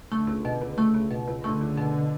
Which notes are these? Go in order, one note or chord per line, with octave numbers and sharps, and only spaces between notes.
D3 A3
C#2
B2
C#2
A3
C#2
B2
C#2
D3 A3
C#2
B2